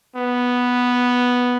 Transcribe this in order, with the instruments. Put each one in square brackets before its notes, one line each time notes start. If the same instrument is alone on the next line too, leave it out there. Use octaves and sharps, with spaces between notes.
[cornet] B3